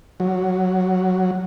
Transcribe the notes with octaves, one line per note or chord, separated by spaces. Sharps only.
F#3